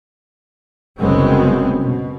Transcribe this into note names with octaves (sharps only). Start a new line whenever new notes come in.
F#1 C2 F#2 G#3 B3 C4
B2